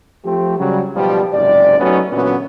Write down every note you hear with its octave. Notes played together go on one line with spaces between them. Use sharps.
F3 A3 C4 G4
C#3 F#3 G3
B1 B2 F3 G3
F#1 G#2 C3 D5
F#3 A3 B3 C#4 D#4 F#4
A#2 D3 E3 F#3 B3 C#4